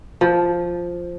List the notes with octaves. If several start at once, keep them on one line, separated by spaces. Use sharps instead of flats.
F3